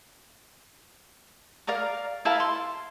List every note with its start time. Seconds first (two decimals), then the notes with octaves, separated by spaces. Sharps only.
1.67 A#4 D5 F5 A#5
2.25 E4 A#4 F5 A5
2.40 C6